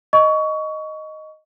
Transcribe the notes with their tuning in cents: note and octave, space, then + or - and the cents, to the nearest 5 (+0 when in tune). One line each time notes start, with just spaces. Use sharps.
D#5 +0 C#6 +25